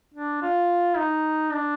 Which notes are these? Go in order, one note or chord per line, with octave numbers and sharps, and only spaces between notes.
D4
F4
D#4
D4